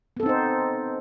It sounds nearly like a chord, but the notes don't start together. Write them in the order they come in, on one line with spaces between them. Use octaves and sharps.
B3 A4 C4 D#4 C5